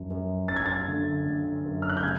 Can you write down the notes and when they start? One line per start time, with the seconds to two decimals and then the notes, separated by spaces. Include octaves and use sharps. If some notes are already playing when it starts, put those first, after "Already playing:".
Already playing: F#2 F3
0.10 F#2
0.48 F#2 A6
0.56 G#6
0.66 A6
0.88 D3
1.26 D3
1.65 F#2
1.82 F6
1.90 F#6
1.97 G6
2.03 C#3 G#6